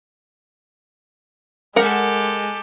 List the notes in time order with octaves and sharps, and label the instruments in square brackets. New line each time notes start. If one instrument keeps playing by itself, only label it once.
[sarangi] G#3 [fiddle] G4 A4 [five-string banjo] A#4 F#5